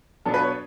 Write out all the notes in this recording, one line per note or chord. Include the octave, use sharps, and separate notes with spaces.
B2 F#3 B3 D4 A4
B4
C#5